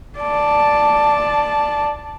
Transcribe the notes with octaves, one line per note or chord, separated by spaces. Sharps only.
D5 A5